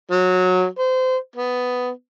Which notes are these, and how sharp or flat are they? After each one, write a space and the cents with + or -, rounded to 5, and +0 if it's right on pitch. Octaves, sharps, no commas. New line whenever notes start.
F#3 -15
C5 -25
B3 +10